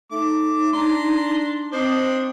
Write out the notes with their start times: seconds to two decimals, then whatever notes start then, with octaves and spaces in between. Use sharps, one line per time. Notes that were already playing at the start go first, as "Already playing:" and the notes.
0.11 A3 D#4 D6
0.73 D4 A#5 C6
1.72 C4 D4 D#4 C5